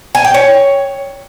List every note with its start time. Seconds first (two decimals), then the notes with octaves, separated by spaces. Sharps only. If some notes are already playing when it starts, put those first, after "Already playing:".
0.15 G#5
0.25 G5
0.34 C#5